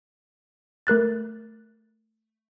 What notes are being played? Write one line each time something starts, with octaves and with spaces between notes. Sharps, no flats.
A3 A#4 F#6 A6